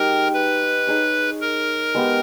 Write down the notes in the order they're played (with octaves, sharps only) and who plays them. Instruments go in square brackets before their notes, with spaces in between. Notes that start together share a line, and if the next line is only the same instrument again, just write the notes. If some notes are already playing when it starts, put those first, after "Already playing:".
Already playing: [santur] G#3 D#4 G4 [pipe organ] A#4
[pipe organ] B4
[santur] D#4 G#4 C#5
[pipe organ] A#4
[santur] G#3 B3 G4